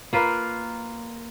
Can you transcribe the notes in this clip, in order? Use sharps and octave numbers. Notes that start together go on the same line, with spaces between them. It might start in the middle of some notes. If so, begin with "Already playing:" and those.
A#3 F4 B4